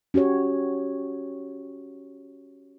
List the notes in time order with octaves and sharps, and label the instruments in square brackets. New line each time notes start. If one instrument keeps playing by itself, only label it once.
[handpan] C#4 F#4 G4 C#5